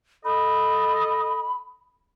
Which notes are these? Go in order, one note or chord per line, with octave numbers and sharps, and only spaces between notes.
A4 D#5 B5